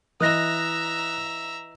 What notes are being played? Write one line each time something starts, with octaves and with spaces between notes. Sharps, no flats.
E3 D#5 E5 A#5 D#6 F#6 A#6